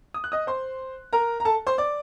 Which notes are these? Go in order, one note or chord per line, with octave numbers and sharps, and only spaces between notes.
D#6
F#6
D#5 D#6
C5 C6
A#4 A#5
A#5
A4 A5
C5 C6
D5 D6